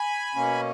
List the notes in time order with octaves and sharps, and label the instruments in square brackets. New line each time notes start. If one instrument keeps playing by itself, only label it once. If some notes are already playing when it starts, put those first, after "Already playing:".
Already playing: [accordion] G#5 B5
B2 A#3 C#4